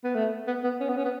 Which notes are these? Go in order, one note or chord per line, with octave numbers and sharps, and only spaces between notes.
B3
A3
B3
B3
C#4
B3
C#4
B3